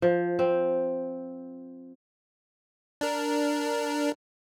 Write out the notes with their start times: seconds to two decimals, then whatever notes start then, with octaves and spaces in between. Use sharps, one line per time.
0.02 F3
0.39 C4
3.01 D4 A#4